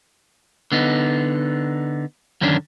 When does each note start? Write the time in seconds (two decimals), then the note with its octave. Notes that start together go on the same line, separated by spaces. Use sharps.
0.72 D3 B3 D#4
2.41 F#2 D3 D#3 C#4 D4